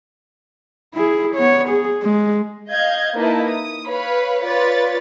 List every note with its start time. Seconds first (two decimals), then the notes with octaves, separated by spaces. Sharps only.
0.94 E4 G#4
1.35 B3 C#5
1.68 G#4
2.02 G#3
2.70 D#5 F5 G6 G#6
3.16 A#3 D#4 E4 B4 A5
3.47 D#6
3.88 B4 C#5 F5 B5
4.43 F4 B4 C#5 D5 A6